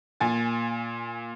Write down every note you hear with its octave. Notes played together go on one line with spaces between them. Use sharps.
A#2 G#5 A6